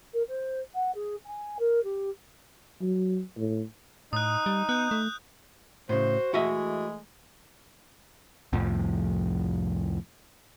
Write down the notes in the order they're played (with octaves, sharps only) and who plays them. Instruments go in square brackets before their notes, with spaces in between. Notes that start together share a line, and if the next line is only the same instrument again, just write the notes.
[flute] A#4
C5
F#5
G#4
G#5
A#4
G4
[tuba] F#3
A2
[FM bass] A2 [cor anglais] D#4 [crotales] D#6 F#6
[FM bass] G3
[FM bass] B3 [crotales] F#6 G6
[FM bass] A3
[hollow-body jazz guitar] A2 C#3 [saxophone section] F#4 C5
[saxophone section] E3 G#3 A3 [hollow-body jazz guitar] F#4 D#5 E5
[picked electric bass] C2 F2 A2 F3